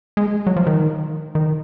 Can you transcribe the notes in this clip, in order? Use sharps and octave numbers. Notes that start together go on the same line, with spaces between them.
G#3
F#3
F3
D#3
D#3